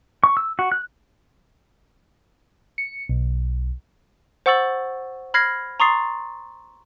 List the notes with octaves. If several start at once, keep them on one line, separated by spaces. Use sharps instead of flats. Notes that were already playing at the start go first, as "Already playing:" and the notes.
C#6
E6
F#4
F#6
C#7
B1
C5 F#5 C#6 E6 A6 F#7
B5 F6 G#6 A#6 C7
A#5 C6 C#6 D#6 A6 C7